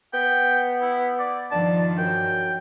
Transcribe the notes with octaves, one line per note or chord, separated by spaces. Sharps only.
B3 G5
E4
D5
G2 D#3 F3 D4 A5
F#2 G5